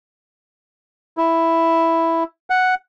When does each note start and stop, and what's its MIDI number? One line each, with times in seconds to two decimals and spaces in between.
1.17 2.24 64
2.50 2.75 78